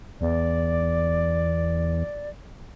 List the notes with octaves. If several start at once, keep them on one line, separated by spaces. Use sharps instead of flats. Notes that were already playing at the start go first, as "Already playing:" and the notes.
E2 D5